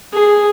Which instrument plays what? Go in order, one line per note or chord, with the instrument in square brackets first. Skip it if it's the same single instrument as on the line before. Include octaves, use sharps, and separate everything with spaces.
[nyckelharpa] G#4